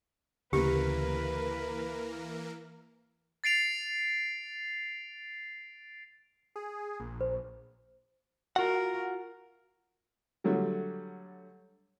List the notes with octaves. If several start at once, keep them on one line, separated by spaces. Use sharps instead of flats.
D2 C#3 E3 A#3 G4 A#4 B4
A6 C7 D7 F7
G#4
A#1
C5
F4 F#4 A#4 F#5
D3 F#3 G3 A3